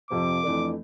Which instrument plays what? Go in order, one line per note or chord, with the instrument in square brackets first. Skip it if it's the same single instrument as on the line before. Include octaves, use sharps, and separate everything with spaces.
[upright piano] F2 C3 F3 C4 [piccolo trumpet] D6
[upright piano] F2 E3 A3 D4 A4